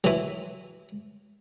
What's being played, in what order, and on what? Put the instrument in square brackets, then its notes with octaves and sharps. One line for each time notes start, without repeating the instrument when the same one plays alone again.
[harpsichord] E3 F#3